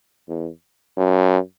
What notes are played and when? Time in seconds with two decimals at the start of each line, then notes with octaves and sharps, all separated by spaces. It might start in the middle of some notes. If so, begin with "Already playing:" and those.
0.29 E2
0.97 F#2